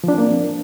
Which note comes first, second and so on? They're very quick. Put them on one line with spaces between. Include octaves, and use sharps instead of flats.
F3 D4 C4 A#3